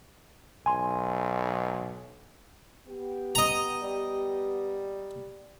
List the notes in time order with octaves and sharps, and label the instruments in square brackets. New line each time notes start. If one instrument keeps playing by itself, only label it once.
[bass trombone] B1 [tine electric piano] G#5 C6
[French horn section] B3 G4
[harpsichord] D#5 A#5
[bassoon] G3